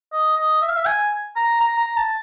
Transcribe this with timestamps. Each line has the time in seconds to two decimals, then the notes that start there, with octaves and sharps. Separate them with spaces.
0.13 D#5
0.37 D#5
0.62 E5
0.69 F5
0.76 E5
0.86 G#5
1.36 A#5
1.61 A#5
1.79 A#5
1.97 A5